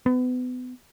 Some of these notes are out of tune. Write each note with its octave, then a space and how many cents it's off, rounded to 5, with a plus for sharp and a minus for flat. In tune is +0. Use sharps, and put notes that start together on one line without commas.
B3 +30